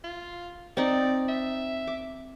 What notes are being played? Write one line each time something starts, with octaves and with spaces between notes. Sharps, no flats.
F4
C4 D#4 D5
E5
D6